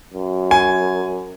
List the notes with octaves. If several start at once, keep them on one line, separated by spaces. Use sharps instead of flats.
F#2
G#5